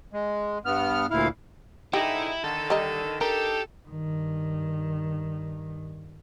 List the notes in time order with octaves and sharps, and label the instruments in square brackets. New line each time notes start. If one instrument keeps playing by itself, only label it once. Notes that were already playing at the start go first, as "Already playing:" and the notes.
[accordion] G#3
G2 B3 F6
D2 A#2 E4 F5
[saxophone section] G#2 D3 D#4 [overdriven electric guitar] E4 E5 [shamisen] G4
[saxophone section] D3 D#3 [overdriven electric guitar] A4
[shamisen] G3 D#4
[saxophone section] D4 D#4 A4 [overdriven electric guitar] G4 [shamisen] A#4
[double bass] G2 D#3